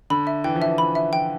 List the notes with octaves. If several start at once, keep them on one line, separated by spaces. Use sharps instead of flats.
D3 B5
E5
E3 G5
F3
E3 E5
F3 B5
E5
F3 G5